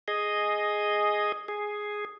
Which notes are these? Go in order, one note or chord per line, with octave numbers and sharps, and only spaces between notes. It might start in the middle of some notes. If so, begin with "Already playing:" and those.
G#4 D#5
G#4